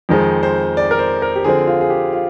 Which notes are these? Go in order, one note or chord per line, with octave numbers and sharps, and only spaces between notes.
F2 D#3 G#3 C4
C5
D5
A#4
C5
A#4
G4
D3 F3 C4 G#4
F4
G#4
G4
F4